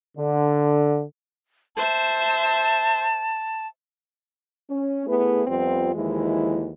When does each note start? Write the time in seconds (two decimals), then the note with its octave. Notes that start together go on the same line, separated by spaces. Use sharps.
0.17 D3
1.76 C5 E5 A5
4.70 C#4
5.06 A3 B3 E4 G#4 B4
5.47 F2 G3 B3 C4 F4
5.94 D#2 E3 F3 G#3 E4